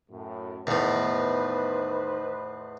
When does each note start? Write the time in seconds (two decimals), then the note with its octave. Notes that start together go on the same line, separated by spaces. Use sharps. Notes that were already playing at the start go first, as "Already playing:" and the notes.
0.11 F#2 A2
0.67 E2 A2 D#3 B3 B4 C5 D#5